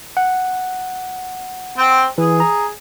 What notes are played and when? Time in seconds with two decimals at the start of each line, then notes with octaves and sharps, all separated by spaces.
0.17 F#5
1.78 C4 G5
2.18 E3 G#4
2.40 A#5